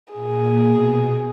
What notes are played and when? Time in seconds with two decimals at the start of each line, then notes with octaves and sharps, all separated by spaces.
0.14 A#2 G#4
0.64 B2